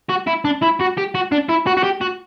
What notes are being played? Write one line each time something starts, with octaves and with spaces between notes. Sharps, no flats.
F#4
E4
D4
E4
F#4
G4
F#4
D4
E4
F#4
F#4
G4
F#4